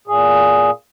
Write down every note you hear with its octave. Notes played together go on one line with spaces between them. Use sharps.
A#2 G#4